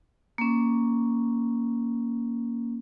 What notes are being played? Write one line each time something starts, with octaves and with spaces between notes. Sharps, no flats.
A#3 C#4